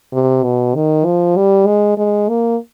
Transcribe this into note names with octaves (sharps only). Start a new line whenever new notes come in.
C3
B2
D#3
F3
G3
G#3
G#3
A#3